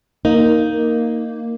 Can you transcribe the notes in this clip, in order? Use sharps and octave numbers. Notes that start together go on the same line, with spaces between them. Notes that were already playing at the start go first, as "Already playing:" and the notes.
A#3 D#4